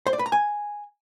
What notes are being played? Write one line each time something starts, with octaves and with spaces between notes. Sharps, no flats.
C5
D5
B4
A#5
G#5